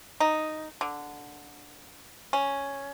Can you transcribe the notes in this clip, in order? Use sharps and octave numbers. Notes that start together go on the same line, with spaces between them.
D#4
D3
C#4